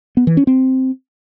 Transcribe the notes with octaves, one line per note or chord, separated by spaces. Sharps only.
B3
E3
C#4
C4